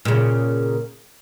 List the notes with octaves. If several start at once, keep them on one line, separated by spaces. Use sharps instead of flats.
A#2 C#3